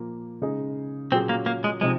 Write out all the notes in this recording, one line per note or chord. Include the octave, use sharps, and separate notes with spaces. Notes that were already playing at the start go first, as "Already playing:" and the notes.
Already playing: A#2 F3 A#3
C#3 G#3 D#4 G#4
A#2 F#3 C4 C#4 G#4
A#3
A#3
G#3
C3 F3 G#3 C4 D#4